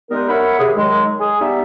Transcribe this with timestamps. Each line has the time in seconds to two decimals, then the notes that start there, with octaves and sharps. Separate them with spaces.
0.10 G3 G#3 B3 D#4 A#4
0.29 A#4 C#5 E5 F#5 B5
0.59 D#2 C3 G#4
0.76 D#3 F#3 G#3
1.20 G#4
1.40 G3 B3 D#4 E5